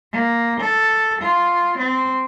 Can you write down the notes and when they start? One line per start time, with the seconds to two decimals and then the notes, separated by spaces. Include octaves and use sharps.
0.12 A#3
0.60 A4
1.21 F4
1.78 C4